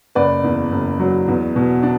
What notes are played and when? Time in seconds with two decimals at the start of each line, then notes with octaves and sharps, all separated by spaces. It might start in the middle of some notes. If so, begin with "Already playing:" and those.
0.15 F#1 B4 D5
0.44 E2
0.72 F#1
1.00 F#3
1.28 E2
1.56 B2
1.83 D4